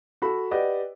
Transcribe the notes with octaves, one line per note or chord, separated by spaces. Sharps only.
F#4 A4 B5
G4 B4 D5 D#5 F#5